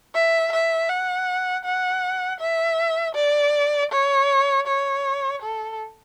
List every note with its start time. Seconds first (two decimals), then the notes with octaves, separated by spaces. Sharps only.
0.14 E5
0.52 E5
0.90 F#5
1.65 F#5
2.40 E5
3.16 D5
3.92 C#5
4.67 C#5
5.42 A4